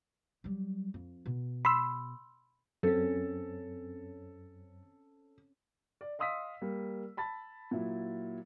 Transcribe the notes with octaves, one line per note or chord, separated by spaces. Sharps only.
F#3 G3
F2
B2
B5 C6 E6
F#2 C4 C#4 A4
D5
D#5 F5 C6 D#6 E6 B6
G3 A#3
A5 B5 A6
A#2 F#3 E4